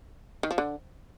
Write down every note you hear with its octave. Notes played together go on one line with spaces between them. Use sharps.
D#3
F3
D3